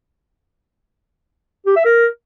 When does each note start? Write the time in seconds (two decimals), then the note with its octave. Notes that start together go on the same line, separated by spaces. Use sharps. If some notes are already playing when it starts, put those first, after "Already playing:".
1.66 G4
1.76 E5
1.85 A#4